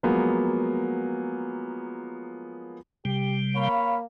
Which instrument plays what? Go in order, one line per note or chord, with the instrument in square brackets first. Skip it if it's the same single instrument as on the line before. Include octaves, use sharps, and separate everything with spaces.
[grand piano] F3 F#3 G#3 A#3 B3
[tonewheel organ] C3 G3 [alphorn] G4
[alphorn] A#3 [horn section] C#5 F5 B5